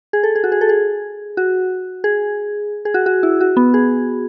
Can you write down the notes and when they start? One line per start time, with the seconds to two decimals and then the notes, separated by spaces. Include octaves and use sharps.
0.13 G#4
0.23 A4
0.35 G#4
0.44 F#4
0.52 G#4
0.61 A4
0.69 G#4
1.37 F#4
2.04 G#4
2.85 G#4
2.94 F#4
3.06 F#4
3.23 E4
3.40 F#4
3.57 B3
3.74 G#4